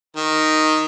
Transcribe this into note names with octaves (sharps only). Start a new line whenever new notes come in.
D#3